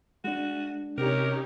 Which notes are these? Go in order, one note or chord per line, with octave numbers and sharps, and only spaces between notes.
G#3 D4 F#4
C3 C#4 D#4 G4 A#4